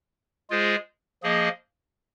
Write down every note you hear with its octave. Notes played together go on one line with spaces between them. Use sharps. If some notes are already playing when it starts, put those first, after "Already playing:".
G#3 F4 G#4 C5
F3 A#3 G#4 D#5